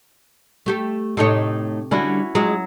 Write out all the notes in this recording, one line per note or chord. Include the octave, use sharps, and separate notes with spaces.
A3 G4 A4
A2 C3 A3 D#4 C#5
D3 G3 C#4 D4 E4 F#4
F#3 G#3 F4 G#4